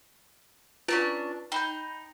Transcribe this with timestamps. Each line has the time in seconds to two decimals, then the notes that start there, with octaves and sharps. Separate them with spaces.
0.88 C#4 D4 F4 B4 A5
1.52 D#4 G5 B5 G6